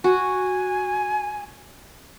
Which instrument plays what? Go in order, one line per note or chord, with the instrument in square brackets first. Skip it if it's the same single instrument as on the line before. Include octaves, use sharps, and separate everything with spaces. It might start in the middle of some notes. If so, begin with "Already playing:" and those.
[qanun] F#4 [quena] G#5